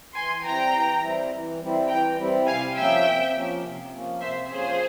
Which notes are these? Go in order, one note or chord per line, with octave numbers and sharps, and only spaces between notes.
E3 G#5 C6
G3 C4 E4 G5 A#5
E3
G3 C4 E4
E3
G3 C4 E4
E3 G5 A#5
G3 C4 E4
C3 F5 G#5
F3 A#3 C#4 E5 G5
C3
F3 A#3 C#4
C3
F3 A#3 C#4
C3 C5 E5
F3 A#3 C#4 G#4 C5